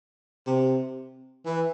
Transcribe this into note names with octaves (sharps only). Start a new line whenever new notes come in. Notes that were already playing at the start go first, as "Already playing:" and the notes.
C3
E3